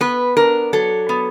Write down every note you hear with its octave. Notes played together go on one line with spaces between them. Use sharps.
B3 B4
D4 A#4
F#3 A4
B3